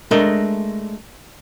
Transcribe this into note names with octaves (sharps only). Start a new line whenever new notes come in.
G#3 A3 D4 A#4 D#5